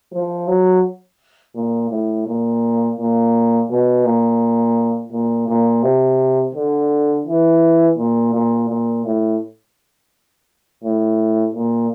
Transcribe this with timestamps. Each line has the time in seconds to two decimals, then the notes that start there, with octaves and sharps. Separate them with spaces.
0.12 F3
0.48 F#3
1.55 A#2
1.91 A2
2.27 A#2
2.98 A#2
3.70 B2
4.05 A#2
5.12 A#2
5.48 A#2
5.83 C3
6.55 D3
7.27 E3
7.98 A#2
8.34 A#2
8.69 A#2
9.05 A2
10.84 A2
11.55 A#2